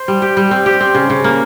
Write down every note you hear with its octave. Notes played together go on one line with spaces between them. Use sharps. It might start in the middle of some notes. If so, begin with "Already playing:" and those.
Already playing: C5
G3
G4
G3
C4
G4
C4
C#3
C#3
A#3